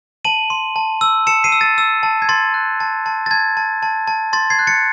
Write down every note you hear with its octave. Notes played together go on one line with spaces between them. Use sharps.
A5 D#7 F#7
C6
A5
E6
A5 C#7 E7
C7 D#7
E6
A6
E6
A5
G#6
C6 A6
F#6
A5
A5
A6
A5 G#6
A5
A5
A5
C6 A6
G#6 C7
F#6
A6 C#7